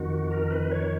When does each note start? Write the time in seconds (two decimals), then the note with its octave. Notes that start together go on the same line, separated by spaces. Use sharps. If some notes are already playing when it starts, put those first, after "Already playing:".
Already playing: F2 D#3 F#4
0.31 A#4
0.50 B4
0.71 C#5